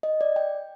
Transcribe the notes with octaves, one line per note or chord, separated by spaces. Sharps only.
D#5
D5
G5